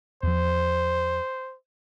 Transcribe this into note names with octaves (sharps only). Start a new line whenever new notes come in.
E2 F3 C5